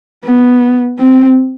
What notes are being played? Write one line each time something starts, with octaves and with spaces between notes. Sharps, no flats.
B3
C4